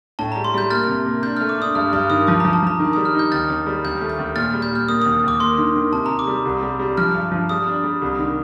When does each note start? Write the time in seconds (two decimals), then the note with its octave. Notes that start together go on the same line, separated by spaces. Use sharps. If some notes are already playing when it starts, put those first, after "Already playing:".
0.19 A2 A5
0.32 A#5
0.36 G3
0.44 C6
0.54 G3 G6
0.70 A#3 F6 A6
0.88 C3
1.06 A#3
1.23 D4 G6
1.37 F6
1.40 A3
1.49 D6
1.58 D4 D#6
1.75 G2 F6
1.93 G2 F6
2.10 D#3 D#6
2.27 F3 D6
2.40 A#5
2.45 F3
2.53 A5
2.63 F3 A#5
2.79 D#3
2.93 D#6
2.97 G3
3.05 F6
3.15 D#4 G6
3.32 D#2 F6 A6
3.49 D#2
3.67 G3
3.84 D#2 G6
4.01 A3
4.10 G6
4.19 D#2
4.36 A#2 F6 A6
4.53 G3
4.62 G6
4.71 A#2 F6
4.88 A#3 D#6
5.02 D#6
5.06 D#2
5.23 D#2 D6
5.40 A#3 C6
5.58 D#3
5.76 D#3
5.92 C3 A5
6.06 A#5
6.10 C3
6.19 D6
6.27 G3
6.45 C2
6.63 G3
6.79 G3
6.97 F3 F6
7.15 G2
7.32 F3
7.49 G3 D#6
7.67 D4
7.84 G3
8.01 C2
8.19 D#3